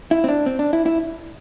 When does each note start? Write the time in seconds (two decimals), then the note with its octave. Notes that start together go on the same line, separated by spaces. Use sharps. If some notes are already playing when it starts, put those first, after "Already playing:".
0.11 E4
0.24 C4
0.28 D4
0.46 C4
0.59 D4
0.73 E4
0.86 E4